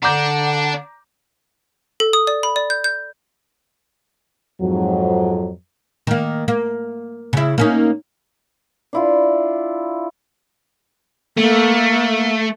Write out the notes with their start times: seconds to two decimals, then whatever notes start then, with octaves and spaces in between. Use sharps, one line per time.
0.03 D3 D4 F#5 A#5 D6 G6
2.00 A4
2.13 D#6
2.27 D5
2.43 B5
2.56 D5
2.70 G6
2.84 G6
4.61 F2 G#2 F#3
6.07 D#3 A#3
6.48 A#3
7.33 C#3 E4
7.58 A#3 C#4 D#4
8.93 D4 E4 F4
11.38 A3 A#3